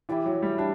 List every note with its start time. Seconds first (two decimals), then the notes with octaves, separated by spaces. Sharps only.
0.09 E3 E4 G4 D5
0.26 F#3
0.42 G3
0.58 D4 E4 G4